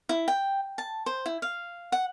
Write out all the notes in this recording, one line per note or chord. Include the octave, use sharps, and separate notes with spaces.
E4
G5
A5
C5
E4
F5
F#5